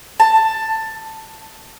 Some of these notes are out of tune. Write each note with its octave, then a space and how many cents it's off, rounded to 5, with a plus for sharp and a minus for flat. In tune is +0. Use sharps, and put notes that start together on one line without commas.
A5 +10